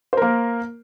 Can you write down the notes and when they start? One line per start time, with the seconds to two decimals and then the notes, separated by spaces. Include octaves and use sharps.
0.13 C5
0.17 A#4
0.22 A#3